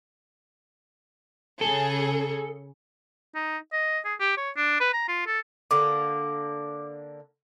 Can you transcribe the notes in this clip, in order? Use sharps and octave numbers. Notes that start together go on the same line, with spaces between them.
C#3 G#4 A4
D#4
D#5
G#4
G4
C#5
D4
B4
A#5
F4
A4
D3 A#3 D6